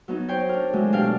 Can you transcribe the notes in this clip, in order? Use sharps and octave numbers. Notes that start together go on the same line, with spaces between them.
F#3 B3 D#4
C5 C#5 G5
D4 A#4
E3 F#3 G#3 A3
B2 D4 G4 F5 G5